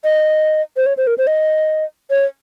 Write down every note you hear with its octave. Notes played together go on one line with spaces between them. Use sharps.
D#5
C5
C#5
C5
A#4
C5
D#5
C#5